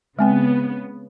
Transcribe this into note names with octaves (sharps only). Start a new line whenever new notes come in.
C#3 G#3 B3 C4 G5